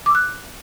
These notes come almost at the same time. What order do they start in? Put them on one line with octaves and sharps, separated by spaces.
D6 E6 F#6